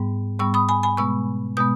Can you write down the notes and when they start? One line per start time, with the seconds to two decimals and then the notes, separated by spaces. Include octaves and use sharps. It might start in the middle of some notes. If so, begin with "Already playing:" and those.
Already playing: G#2 G3 B3
0.39 G#2 G3 B3 C#6 E6
0.54 B5 D#6
0.69 G#5 B5
0.83 G#5 B5
0.97 B2 G#3 B3 C#6 E6
1.57 B2 G#3 B3 D#6 G6